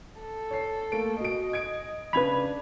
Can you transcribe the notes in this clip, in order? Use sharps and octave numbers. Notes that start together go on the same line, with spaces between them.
A4
C#5 C7
A3 A#3 D7
B2 D#5 D7
G#6 D7
C#3 D4 B4 B5 G#6 F7